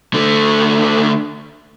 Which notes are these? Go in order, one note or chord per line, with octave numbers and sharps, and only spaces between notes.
D3 A3